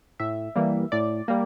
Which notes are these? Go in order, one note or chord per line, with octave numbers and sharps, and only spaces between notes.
A2 E5
E3 G3 A#3
A2 D5
G3 A#3